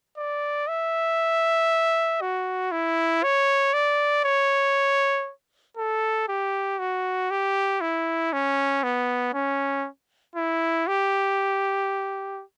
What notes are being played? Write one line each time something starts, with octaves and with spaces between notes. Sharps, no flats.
D5
E5
F#4
E4
C#5
D5
C#5
A4
G4
F#4
G4
E4
C#4
B3
C#4
E4
G4